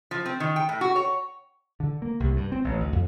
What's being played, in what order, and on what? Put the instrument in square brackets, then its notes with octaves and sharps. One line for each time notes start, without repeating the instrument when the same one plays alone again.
[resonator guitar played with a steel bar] F3
C4
D#3
G5
A2
F#4
C#5
[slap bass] D3
A#3
C2
G2
C4
A1
D2
F2